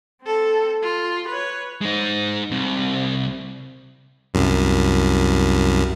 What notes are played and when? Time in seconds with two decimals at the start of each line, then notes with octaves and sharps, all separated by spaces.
0.22 C4 A4
0.82 F4
1.28 B4 C#5
1.81 G#3 D#4
2.51 C2 C3
4.34 C2 F#2